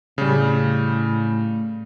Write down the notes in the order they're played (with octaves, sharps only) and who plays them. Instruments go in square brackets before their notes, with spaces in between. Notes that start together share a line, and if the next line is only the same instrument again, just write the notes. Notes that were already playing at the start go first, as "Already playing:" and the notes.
[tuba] A2 [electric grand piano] C#3 G3